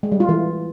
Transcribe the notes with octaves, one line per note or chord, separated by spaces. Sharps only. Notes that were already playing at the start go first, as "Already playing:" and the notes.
G#3
G3
F4
E3